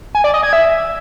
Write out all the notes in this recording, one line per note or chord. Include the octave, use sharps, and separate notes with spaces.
G#5
D5
D#5
G#6
E5